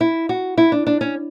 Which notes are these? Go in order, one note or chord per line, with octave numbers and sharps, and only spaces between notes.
E4
F#4
E4
D4
D4
C#4